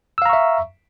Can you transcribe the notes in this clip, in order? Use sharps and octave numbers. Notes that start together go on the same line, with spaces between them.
E5 F5 A#5 C#6 E6